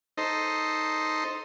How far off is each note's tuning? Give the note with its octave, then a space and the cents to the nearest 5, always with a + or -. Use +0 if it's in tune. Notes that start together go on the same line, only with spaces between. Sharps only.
D#4 +0 A4 +0 C5 +0